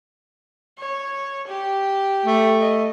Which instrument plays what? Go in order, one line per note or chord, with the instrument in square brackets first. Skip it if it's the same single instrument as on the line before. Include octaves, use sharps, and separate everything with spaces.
[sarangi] C#5
G4
[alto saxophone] A3
[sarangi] D#5